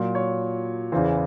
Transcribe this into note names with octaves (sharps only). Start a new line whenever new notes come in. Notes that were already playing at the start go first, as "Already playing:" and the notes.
Already playing: A#2 F#3
C#5
E2 C#3 E3 C5